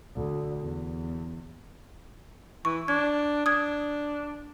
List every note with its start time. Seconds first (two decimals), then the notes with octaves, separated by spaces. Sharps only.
0.15 D2
0.61 E2
2.65 E3 C#6
2.88 D4 G#6
3.46 D4 D#6 G#6